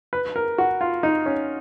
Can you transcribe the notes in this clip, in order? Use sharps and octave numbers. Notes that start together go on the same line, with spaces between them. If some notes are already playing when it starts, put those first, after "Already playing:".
B4
A#4
F#4
F4
D#4
C#4